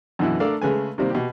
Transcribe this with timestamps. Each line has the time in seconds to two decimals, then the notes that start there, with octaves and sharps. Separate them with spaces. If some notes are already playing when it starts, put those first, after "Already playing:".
0.19 F#2 B2 D3 E3 B3 E4
0.40 A3 D4 A4 A#4 D5 F5
0.62 C#3 G#3 A3 B4 G#5
0.98 C3 D#3 G3 A#3 C4
1.10 B2 G4